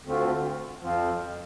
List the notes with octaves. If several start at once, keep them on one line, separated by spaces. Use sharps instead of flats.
D2 D3 A3 C4 F4
F2 F3 C4 F4